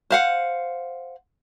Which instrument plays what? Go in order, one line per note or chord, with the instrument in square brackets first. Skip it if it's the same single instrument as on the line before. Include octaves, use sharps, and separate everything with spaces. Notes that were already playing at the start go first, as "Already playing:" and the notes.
[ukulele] C5 F5 F#5